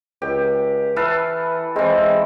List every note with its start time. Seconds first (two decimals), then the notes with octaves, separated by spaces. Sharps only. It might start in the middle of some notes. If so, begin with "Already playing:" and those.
0.22 C#2 G4
0.96 E3 A4 B4 F5
1.76 E3 G#3 C4